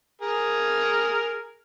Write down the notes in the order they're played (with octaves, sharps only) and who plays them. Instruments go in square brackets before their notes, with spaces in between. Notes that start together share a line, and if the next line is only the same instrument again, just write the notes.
[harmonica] G#4 A#4